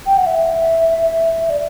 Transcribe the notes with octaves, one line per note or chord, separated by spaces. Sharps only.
G5
F#5
E5
D5